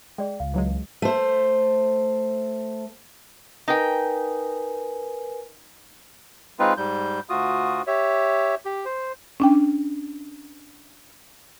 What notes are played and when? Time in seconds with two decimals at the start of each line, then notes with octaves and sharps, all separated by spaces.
0.18 G#3 G#4 D5 G5
0.40 C#2 F5
0.54 E3 F#3 G#3
1.02 A3 C5
3.68 D#4 A#4 B4 G5 G#5
6.59 G#3 C4 D#4 F4 B4
6.77 G#2 G3 G6
7.30 D2 F4 F#4 D#6
7.87 G4 C#5 E5
8.65 G4
8.85 C5
9.40 C#4 D4 G5